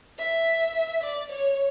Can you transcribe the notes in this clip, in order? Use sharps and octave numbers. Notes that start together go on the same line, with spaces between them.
E5
D5
C#5